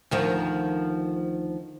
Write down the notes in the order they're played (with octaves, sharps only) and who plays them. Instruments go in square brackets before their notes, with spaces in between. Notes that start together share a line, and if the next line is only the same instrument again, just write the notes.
[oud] D2 D#3 F3